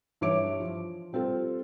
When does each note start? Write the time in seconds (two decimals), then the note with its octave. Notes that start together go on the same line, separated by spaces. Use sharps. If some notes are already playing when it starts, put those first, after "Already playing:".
0.21 G2 E3 C#5 E5 D6 D7
0.60 F3
1.13 G3 C4 F4 A4